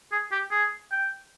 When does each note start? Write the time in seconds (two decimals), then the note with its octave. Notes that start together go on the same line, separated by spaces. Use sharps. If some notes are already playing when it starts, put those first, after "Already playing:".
0.12 G#4
0.32 G4
0.51 G#4
0.92 G5